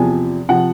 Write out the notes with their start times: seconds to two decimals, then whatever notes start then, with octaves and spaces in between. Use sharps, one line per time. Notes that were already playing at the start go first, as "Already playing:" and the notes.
Already playing: E2 C3 F3 G#5
0.49 C3 F3 F#5